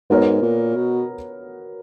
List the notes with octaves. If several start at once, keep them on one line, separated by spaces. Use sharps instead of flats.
G#2 B3 F#4 A#4 C#5
A#2
B2